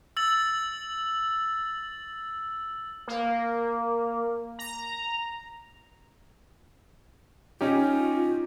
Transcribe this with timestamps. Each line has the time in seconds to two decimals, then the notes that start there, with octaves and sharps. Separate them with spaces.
0.17 E6 A6 F#7
3.08 A#3
4.59 A#5
7.61 C#4 D#4 F4 G4